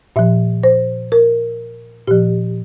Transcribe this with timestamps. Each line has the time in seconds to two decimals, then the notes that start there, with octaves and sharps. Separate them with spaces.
0.16 A#2 F3 E5
0.63 C5
1.12 A#4
2.07 A#2 F3 G4